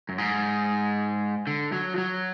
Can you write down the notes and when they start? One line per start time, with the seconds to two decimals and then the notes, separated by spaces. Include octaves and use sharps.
0.09 F#2
0.18 G#2
1.47 D3
1.72 F#3
1.94 F3
1.98 F#3